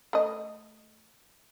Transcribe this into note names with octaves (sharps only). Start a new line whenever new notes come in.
A3 D#5